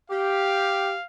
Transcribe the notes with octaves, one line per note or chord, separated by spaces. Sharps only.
G4 F5